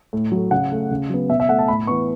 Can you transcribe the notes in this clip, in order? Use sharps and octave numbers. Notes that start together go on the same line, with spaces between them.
A2
F#3 A3
C#3 F#5
A3
C#3
F#3 B3
B2 E5
E5
A3 F#5
A5
A2 B5
E3 B3 C#6